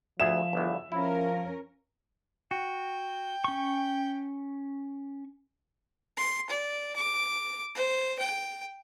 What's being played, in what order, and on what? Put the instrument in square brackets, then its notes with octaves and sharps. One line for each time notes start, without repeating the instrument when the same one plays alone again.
[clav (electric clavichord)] D2 G#4 [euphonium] F3 [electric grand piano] E5 E7
[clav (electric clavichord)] G1 E2
[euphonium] F3 [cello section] C#4 A#4 [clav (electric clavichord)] E4
[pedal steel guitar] F#4 [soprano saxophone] G5
[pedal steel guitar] C#4 C#6
[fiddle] C6
D5
D6
C5
G5